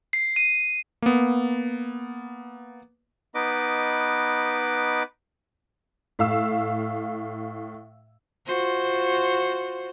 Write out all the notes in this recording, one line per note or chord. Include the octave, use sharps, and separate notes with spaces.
C7
D#7
A#3 B3
B3 D#4 B4 D#5 D6
A2 F5 E6
F4 F#4 C5